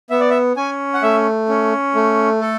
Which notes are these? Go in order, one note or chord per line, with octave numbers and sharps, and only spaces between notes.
B3 E5
D5
E5
C#4 G#5
F#5
A3 E5
C#4
A3
A4